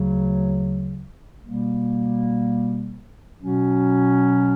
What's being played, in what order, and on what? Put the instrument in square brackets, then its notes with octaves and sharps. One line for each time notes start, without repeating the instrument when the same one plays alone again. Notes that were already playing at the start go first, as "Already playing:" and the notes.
Already playing: [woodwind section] D2 C#3 F#3
B2 G3 A#3
B2 F#3 C#4 F#4